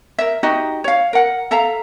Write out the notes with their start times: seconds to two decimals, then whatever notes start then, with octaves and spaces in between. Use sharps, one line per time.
0.18 A#4 E5
0.43 D#4 F#4 G4 D#5
0.84 C#5 F5
1.13 A#4 F#5
1.51 A4 E5 F5 A#5